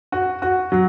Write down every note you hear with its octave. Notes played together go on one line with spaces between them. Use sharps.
F#4
F#4
F#3